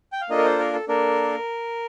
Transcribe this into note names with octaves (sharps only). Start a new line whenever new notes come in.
G5
F5
A#3 D4 F4 A4 D#5
A#4
C5
A#4
A4
A#3 D4 A4 A#4